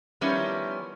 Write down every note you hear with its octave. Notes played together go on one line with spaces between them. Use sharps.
D#3 F3 G3 B3 C#4 E4